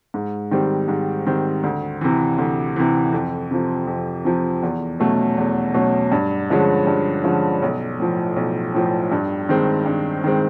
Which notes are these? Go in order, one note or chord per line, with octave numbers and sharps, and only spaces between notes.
G#2
D#3 G3 C4
G#2
D#3 G3 C4
D2
C3 E3
D2
C3 E3
F2
C3 F3
F2
C3 F3
E2
B2 F#3 A3 C#4
E2
B2 F#3 A3 C#4
G2
D3 F3 G#3 C#4
G2
D3 F3 G#3 C#4
B1
A2 F3
B1
A2 F3
G2
D#3 G#3 C4
G2
D#3 G#3 C4